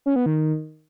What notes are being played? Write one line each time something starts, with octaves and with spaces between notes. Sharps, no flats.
C#4
B3
D#3